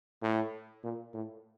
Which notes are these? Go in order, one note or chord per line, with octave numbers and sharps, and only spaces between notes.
A2
A#2
A2